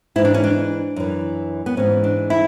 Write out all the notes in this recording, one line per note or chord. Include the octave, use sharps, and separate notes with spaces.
G#2 E3 E4
D4
C#4
D4
F#2 E3
B3
G#2 E3 C#4
D4
E4